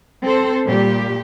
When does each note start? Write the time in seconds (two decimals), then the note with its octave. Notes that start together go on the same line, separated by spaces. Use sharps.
0.23 C4 A4 C5
0.67 A#2 G3 G4